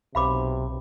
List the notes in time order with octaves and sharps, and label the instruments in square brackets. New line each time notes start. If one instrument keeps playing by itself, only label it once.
[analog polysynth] B1 [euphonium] C3 [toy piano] F5 B5 D6